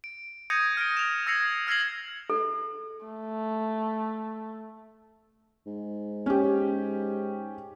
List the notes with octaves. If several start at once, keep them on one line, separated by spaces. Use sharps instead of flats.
D7
D#6 G6 G#6 A#6 C#7 D#7
F6 A#6 D7
E7 F7
E6 G#6 A#6 C7 C#7 F7
E6 F6 G#6 A#6 C7 F#7
A4
A3
G#2
C#4 G4